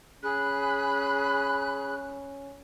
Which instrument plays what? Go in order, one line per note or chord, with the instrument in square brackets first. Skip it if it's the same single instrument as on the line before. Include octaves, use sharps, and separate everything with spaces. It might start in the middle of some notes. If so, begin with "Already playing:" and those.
[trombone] C#4 [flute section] G#4 B5 F#6